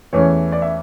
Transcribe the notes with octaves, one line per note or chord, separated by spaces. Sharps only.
E2 E3 A3 C#4 C#5
D5
E5